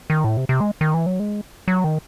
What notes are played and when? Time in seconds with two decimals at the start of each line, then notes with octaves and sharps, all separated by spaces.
0.10 D#3
0.24 A2
0.37 C3
0.49 C3
0.61 G#3
0.81 D#3
0.94 E3
1.06 F#3
1.20 G#3
1.68 F#3
1.84 D#3